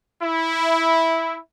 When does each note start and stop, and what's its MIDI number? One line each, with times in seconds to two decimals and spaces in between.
0.23 1.38 64